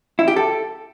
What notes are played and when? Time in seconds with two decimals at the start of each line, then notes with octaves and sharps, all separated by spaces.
0.19 E4
0.28 G4
0.36 A4